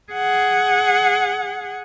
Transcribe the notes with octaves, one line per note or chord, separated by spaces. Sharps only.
G#4 F#5